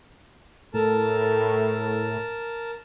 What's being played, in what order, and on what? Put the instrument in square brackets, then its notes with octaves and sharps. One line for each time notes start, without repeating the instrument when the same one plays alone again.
[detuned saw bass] A2 [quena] A4 [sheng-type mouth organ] A#4 A5